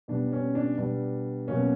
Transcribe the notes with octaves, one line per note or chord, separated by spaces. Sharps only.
B2 G3 B3 D4
C#4
D4
B2 G3 B3 D4
B2 F#3 A#3 C#4